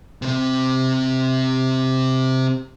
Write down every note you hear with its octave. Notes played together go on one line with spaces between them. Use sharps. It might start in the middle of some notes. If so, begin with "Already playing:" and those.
C3 C4